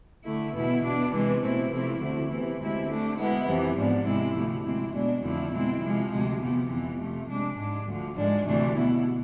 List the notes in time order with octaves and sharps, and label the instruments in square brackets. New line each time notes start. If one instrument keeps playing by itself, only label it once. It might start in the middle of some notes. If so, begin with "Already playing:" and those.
[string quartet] D3 A3 E4
E2 B2 B3 E4
B2 B3 D4
C3 E3 G#3
B2 A3 C4 E4
C3 F3 A3 C4 E4
D2 D3 A3 C4 E4
C3 E3 B3 E4
D2 C3 G#3 C4 E4
D3 A3 D4
B2 G#3 B3 E4
F2 C3 E3
G#2 F3 B3 D4
C3 G#3 C4 E4
D2 C3 F3 A3
D2 C3 G#3 C4 E4
B2 G#3 B3 D4
F2 D3 F3 A3 E4
B2 G#3 C4 E4
C3 F3 G#3
D2 C3 G#3
E2 C3 F3 B3
F2 E3 B3
C3 F3 A3
C3 G#3 D4
G#2 G#3 D4
D2 D3 F3
G#2 F3 G#3 D4
D2 C3 E3 A3 D4
B2 B3 E4